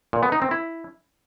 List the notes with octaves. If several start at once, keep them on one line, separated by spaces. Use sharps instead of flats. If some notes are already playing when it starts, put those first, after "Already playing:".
A#2
B3
D#4
C4
E4